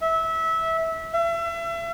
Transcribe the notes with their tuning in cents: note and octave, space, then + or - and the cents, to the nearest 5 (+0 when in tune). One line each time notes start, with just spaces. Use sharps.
E5 -20
E5 +35